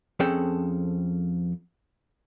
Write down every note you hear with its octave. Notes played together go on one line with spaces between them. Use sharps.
F2 C4 C#4 G#4 A4 G5